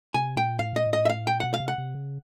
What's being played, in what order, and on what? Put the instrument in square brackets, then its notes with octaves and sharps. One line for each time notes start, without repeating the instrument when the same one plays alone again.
[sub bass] C3 [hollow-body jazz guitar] G#5
[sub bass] A#2 [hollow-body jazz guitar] G5
[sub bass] A2 [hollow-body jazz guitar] F5
[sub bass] A#2 [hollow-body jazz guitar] D#5
[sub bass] A2
[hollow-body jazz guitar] D#5
E5
F5
[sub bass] A#2 [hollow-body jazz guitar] G5
[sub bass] B2 [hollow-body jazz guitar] F#5
[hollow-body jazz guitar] F5
[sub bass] C3
[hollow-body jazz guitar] F#5
[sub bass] C3
C#3